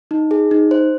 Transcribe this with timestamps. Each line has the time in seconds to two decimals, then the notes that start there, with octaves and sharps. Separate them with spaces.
0.11 D#4
0.31 G#4
0.51 D#4
0.71 C5